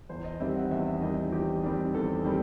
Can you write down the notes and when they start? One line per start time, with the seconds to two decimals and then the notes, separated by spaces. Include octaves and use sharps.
0.09 E2 C5
0.24 D#5
0.40 D#3 G3 C4 E5
0.56 F#5
0.71 E2 E5
1.01 D#3 G3 C4 D#5
1.32 E2 G4
1.63 D#3 G3 C4
1.94 E2 A4
2.24 D#3 G3 C4